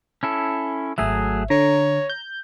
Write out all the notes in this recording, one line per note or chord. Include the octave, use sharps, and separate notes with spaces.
C#4 E4 A4
G#1 F#3 A3 G#4 E5
D3 C#5 A#5
G6